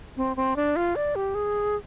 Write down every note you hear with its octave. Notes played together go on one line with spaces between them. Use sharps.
C4
C4
D4
F4
D5
G4
G#4